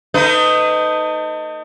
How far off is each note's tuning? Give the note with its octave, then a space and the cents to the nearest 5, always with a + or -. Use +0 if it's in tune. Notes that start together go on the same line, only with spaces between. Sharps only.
A3 +40 D#4 +0 B4 +40